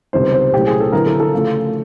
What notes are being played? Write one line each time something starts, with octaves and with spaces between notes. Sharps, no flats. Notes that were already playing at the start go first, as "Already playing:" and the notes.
C#2 C3 D#3 G3 B3 C5
C5
C2 A#2 F#3 A3 C#4 G4
G#4
A4
D3 F#3 B3 E4 A#4
A4
A4
C#3 F3 A3